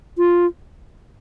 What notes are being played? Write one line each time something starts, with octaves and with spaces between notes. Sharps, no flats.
F4